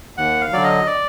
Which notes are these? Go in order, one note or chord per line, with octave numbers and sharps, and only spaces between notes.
D#2 F#5
F5
D3 F#3 D5
D#5
D5